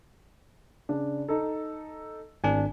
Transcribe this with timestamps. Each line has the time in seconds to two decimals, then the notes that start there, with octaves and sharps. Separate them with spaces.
0.89 C#3 D4
1.29 D#4 A4
2.44 G#1 D4 G#5